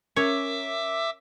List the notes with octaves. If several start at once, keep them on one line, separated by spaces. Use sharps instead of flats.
C#4 A#4 C#5 E5 D6 E6